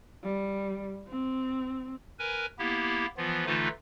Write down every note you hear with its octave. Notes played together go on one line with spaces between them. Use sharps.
G3
C4
A#4 B4 G#5
A#3 B3 E4 G4
E3 F3 B3 F4
D3 E3 A3 D#4 F4 B4